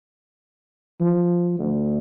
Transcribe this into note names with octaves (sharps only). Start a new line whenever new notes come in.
F3
D2